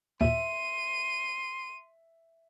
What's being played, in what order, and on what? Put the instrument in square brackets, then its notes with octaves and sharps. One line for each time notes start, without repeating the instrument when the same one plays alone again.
[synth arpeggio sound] D#2 A#2 [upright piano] E5 [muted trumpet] C6 [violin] D#7